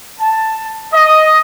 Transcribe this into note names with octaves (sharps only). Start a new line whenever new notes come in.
A5
D#5